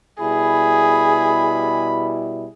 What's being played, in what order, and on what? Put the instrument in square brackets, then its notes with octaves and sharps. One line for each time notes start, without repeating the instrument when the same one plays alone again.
[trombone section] B2 G3 E4 [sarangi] G#4 [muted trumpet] B5